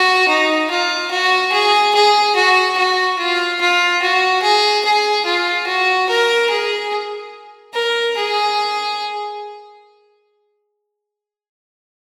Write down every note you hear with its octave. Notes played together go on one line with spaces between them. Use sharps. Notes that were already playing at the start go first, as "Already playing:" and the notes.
Already playing: F#4
D#4
F4
F#4
G#4
G#4
F#4
F#4
F4
F4
F#4
G#4
G#4
F4
F#4
A#4
G#4
A#4
G#4